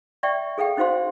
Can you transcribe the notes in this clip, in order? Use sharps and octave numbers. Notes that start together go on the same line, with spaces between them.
D5 E5 G5 C#6
G#4 A4 F5 G5
C#4 D#4 F#4 C5 F5 C6